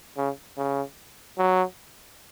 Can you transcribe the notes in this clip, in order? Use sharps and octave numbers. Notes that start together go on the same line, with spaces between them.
C#3
C#3
F#3